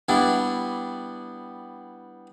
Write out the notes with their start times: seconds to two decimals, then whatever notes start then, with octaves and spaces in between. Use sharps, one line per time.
0.09 G3 B3 D4 E4